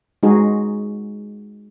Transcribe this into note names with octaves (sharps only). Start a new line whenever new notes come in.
G#3 D#4 F#4 G#4